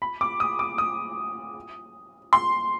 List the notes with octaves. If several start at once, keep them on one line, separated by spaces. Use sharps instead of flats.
B5
D6
D#6
D6
D#6
C6